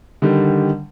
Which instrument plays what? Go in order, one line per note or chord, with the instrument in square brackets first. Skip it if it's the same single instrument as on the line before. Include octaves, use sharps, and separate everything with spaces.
[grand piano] D3 D#3 G3